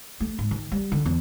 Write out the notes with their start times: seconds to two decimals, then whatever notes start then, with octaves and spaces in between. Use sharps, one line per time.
0.20 A3
0.39 G#2
0.51 D#3
0.72 G3
0.92 D3
1.06 E2